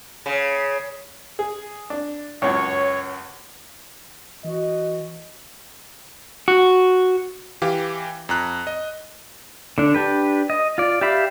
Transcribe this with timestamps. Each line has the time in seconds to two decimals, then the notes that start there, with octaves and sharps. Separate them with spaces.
0.26 C#3
1.39 G#4
1.90 D4
2.42 C#2 F#2 C#5
4.44 E3 F#4 D#5
6.48 F#4
7.62 E3 G4 F5
8.29 F2 A#5 F#6
8.67 D#5
9.78 D3 D4
9.94 D4 G4 B4
10.50 D#5
10.78 F4 D5
11.01 G4 D5 E5 F5 B5